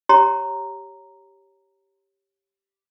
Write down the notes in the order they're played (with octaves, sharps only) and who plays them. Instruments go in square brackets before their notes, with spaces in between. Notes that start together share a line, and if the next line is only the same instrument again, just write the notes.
[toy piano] G4 C#5 A#5 C6